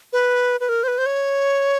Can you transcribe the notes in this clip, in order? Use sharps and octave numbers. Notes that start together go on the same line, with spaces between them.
B4
B4
A#4
C5
B4
C5
C#5